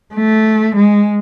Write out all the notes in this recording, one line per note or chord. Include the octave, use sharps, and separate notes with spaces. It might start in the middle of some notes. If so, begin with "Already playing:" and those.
A3
G#3